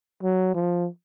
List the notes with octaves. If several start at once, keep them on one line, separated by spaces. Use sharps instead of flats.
F#3
F3